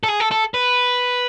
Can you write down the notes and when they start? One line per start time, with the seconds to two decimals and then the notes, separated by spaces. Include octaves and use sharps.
0.03 A4
0.08 G#4
0.20 A4
0.31 A4
0.54 B4